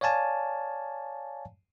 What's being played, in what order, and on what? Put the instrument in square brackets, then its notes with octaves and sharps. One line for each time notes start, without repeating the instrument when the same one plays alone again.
[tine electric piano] C#5 D5 F5 G#5 A5